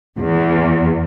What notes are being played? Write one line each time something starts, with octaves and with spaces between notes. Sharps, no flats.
E2